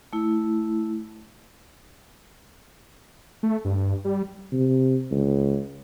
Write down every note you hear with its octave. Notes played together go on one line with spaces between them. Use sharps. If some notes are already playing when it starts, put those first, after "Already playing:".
A3 E4
A3
G2
G3
C3
C#2